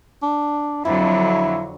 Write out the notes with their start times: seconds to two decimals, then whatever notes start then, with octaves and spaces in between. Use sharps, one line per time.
0.22 D4
0.85 F2 D3 F#3 E4